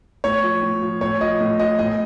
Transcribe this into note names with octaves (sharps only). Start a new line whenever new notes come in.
A2 C#5
F3
A2
F3
A2 C#5
F3 D#5
A2
F3 D#5
A2 D#5